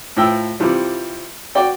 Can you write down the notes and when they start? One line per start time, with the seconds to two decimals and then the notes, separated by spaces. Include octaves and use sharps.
0.16 A2 F3 G5 E6
0.60 C3 E3 F3 G3
1.55 F#4 D5 G5